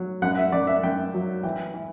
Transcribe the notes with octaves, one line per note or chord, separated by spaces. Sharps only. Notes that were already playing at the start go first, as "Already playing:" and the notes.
Already playing: F#3
F#2 F#5
E5
F#2 D5
E5
F#2 G5
F#3
E3 G5
E3